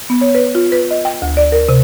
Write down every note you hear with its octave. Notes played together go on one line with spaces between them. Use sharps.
B3
C#5
B4
F4
B4
D#5
G5
D2
D5
A#4
C3